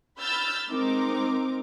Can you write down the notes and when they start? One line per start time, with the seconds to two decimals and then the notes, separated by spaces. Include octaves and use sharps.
0.19 B5 E6 F6 G6 A6
0.70 G#3 C4 D#4 A#4 D6